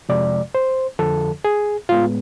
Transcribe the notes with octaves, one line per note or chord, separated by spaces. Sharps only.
F2 C3 F3 G#3 D5
C5
F2 D3 F3 A4
G#4
A2 G#3 B3 F4